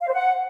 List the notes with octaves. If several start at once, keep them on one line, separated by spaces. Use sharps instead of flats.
F5
C5
F#5